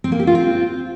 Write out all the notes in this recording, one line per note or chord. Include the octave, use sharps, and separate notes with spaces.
C4
A#3
G4
F4
C4